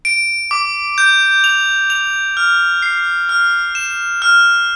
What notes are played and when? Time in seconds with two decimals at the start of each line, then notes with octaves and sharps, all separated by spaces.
0.05 D7
0.51 D6
0.98 G6
1.44 F7
1.90 F7
2.37 F6
2.82 C7
3.29 F6
3.75 E7
4.22 F6